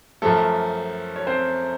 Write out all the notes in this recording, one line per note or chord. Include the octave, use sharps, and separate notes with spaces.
F#2 F3 A3 A4
C#5
C4 C5